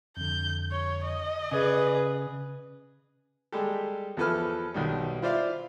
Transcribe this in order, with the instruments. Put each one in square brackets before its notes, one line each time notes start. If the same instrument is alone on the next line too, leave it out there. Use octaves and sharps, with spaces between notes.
[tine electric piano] F2 D3 [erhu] G6
[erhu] C#5
D#5
[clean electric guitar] C#3 [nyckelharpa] G#4 B4 [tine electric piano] D5 G#5
[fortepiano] G3 G#3 G4 A4
E2 F3 A4 B4 F6
B1 D#3 G3
E4 F4 C5 D5 E5 F5